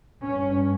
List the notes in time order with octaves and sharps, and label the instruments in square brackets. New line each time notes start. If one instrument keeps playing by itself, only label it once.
[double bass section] G2 C#4